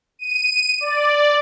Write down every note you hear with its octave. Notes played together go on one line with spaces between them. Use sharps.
D#7
D5